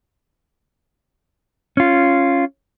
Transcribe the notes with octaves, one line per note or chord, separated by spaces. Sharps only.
C#4 F4